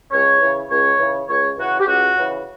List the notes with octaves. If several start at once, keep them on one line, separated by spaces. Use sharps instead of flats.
C#2 C#5
C#3 E3
C#2 C#5
C#3 E3
C#2 C#5
C#3 E3 F#4
G4
C#2 F#4
C#3 E3